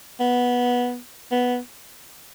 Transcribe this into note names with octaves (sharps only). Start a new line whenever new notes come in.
B3
B3